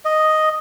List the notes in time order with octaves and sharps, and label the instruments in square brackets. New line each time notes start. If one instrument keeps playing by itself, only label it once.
[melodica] D#5